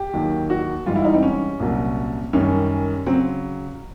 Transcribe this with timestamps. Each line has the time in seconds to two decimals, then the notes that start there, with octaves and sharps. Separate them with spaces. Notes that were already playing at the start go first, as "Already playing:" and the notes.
Already playing: G4
0.13 D#2 D#3 F#3
0.50 F#4
0.86 G#2 E3 G3 F4
0.96 E4
1.05 D#4
1.14 C4
1.23 C#4
1.60 C2 A#2 F#3
2.33 F#2 D#3 G3 C#4
3.06 C#3 F#3 C4